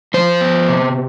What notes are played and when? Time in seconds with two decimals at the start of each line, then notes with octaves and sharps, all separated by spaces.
0.14 F3 C5
0.41 B3
0.68 C3